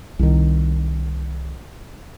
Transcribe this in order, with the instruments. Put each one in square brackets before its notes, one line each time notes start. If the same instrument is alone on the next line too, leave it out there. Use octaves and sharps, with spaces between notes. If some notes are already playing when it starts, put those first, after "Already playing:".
[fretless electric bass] C2 D#3